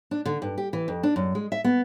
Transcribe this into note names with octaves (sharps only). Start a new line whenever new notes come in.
D4
D3
G2
G4
E3
F2
D4
F#2
G#3
E5
B3